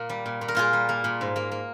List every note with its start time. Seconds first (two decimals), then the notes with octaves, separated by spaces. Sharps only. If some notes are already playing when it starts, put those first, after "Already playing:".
Already playing: A#2 A#3
0.09 G3
0.26 A#2
0.41 A#2
0.48 A#4
0.55 A#2 F4 G#4
0.73 G3
0.89 A#3
1.04 A#2
1.21 G#2
1.36 A#3
1.51 A#3